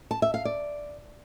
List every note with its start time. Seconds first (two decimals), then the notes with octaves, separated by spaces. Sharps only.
0.11 A5
0.22 E5
0.34 F5
0.45 D5